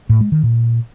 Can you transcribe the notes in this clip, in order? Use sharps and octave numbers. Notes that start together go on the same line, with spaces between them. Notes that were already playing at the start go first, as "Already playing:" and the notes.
A2
G#3
D#3
A#2